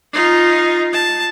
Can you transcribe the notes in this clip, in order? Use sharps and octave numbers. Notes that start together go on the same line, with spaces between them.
D#4 F4
A5